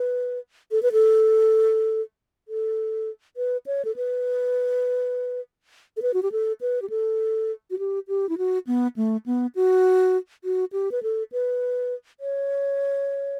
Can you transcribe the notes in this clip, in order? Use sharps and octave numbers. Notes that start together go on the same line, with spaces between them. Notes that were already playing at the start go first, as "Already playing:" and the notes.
Already playing: B4
A4
B4
A4
A4
B4
C#5
A4
B4
A4
B4
F#4
G4
A4
B4
G4
A4
F#4
G4
G4
E4
F#4
B3
A3
B3
F#4
F#4
G4
B4
A4
B4
C#5